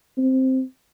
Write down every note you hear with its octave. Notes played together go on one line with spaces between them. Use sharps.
C4